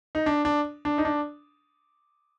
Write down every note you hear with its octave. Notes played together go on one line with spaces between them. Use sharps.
D#4
D4
D4
D4
D#4
D4